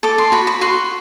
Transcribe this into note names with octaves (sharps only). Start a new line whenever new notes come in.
A4 D6
C6
F#4 B5
B5
F#4 C6